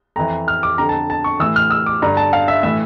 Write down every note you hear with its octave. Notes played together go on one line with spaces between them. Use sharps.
F2 E3 A#5
F6
D6
F2 D3 A#5
A5
A5
C#6
A2 E3 E6
F6
E6
D6
G2 D3 A#5
A5
F5
E5
A2 E3 E5